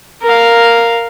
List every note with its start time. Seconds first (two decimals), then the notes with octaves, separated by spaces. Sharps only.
0.23 A#4 F5